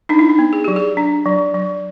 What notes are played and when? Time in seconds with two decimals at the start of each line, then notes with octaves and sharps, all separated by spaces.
0.09 D4 D#4
0.19 E4
0.29 D#4
0.39 B3
0.53 G#4
0.64 F#3 G4
0.76 G#4
0.97 D4
1.26 F#3
1.55 F#3